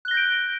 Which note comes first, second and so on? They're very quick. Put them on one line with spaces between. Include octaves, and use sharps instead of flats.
F#6 G7 A#6 G6 D7